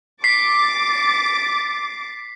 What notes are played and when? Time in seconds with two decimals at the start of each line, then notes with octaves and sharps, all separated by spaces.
0.24 D6 A6 B6 C7